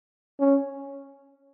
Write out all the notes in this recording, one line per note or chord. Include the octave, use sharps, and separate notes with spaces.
C#4